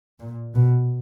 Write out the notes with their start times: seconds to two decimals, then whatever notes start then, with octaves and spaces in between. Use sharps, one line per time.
0.20 A#2
0.55 B2